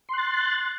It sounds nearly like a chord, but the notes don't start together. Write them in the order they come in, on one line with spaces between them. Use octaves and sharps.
C6 F#6 A6